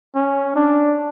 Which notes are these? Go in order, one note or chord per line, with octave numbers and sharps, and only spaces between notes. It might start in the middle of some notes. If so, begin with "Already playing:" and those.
C#4
D4